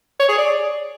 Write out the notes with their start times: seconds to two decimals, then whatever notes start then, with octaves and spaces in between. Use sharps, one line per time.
0.20 C#5
0.29 G#4
0.38 D5